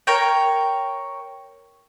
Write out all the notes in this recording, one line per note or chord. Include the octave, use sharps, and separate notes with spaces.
A#4 C#5 G5